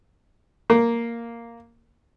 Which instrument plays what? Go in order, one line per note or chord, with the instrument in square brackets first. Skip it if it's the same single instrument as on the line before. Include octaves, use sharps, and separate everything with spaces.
[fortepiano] A#3